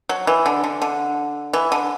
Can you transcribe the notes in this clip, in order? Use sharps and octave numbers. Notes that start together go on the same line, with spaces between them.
F#3
E3
D3
D3
D3
E3
D3